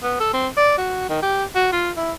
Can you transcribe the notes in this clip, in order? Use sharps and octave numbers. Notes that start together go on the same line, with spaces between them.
B3
A4
C4
D5
F#4
D#3
G4
F#4
F4
E4